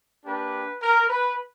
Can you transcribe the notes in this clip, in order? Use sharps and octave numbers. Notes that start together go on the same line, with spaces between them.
A#3 D4 G4 B4
A#4
B4